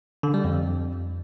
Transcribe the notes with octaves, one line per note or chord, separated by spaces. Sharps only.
D3
G3
F2